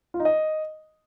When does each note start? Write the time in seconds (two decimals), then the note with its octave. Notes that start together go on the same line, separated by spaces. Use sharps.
0.14 F4
0.20 D#4
0.25 D#5